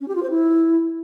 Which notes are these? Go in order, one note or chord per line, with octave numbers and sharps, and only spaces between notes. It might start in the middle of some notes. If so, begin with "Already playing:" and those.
C#4
G4
F4
C5
E4